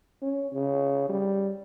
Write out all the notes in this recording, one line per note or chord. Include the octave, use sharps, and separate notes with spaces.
C#4
C#3
G3